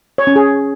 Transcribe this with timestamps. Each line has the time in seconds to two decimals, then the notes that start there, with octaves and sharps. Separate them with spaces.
0.18 C#5
0.27 C#4
0.36 G#4